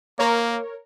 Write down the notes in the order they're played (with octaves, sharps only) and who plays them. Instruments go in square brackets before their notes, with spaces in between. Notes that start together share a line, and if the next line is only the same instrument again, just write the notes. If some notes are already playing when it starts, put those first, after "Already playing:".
[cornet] A#3 [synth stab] A#4 C#5